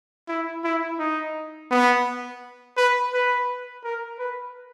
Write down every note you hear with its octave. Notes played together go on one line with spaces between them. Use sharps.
E4
E4
D#4
B3
B4
B4
A#4
B4